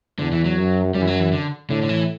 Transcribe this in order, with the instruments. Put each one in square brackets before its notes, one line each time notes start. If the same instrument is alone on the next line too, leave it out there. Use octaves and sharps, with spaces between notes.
[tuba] E2 [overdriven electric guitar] D3
[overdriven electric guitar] E3
F#3
[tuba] F#2
[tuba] F#2 [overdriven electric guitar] G3
[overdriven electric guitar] E3
F#3
E3
D3
[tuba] A2 [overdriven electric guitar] D3
[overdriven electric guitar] D3
E3